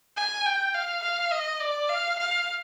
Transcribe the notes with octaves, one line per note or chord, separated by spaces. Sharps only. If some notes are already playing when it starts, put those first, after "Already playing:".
G#5
G5
F5
F5
D#5
D5
F5
F5